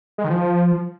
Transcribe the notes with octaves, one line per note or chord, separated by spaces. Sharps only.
G#3
D#3
F3